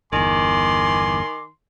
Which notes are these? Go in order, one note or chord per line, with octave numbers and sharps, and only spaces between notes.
G1 E2 D#3 G#5 C6 D6